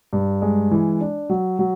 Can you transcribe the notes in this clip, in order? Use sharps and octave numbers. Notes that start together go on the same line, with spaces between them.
G2
G#3
E3
D4
F#3
F#3